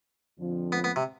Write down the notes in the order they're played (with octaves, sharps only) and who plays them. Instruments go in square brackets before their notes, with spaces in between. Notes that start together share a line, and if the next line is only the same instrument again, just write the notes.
[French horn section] F2 D3 F3 C4
[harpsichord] B3
B3
C3